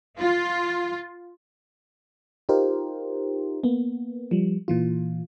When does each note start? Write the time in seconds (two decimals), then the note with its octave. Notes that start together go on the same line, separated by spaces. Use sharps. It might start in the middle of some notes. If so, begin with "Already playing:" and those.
0.18 F4
2.49 D#4 F4 G4 A#4 C5
3.64 A#3 B3
4.31 F3 G3
4.68 A#2 E3 F4